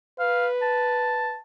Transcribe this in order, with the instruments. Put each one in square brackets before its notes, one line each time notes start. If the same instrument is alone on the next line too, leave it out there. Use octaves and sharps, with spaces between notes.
[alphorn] B4 [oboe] F5
[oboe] A5